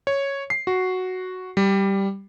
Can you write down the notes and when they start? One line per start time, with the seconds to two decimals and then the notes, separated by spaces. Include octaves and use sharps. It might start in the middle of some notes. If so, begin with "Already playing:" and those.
0.07 C#5
0.50 C7
0.67 F#4
1.57 G3